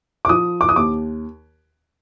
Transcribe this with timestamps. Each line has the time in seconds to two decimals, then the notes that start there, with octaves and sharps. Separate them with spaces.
0.25 D6
0.29 F3 D#6
0.61 D6
0.69 D#6
0.76 D#2 D6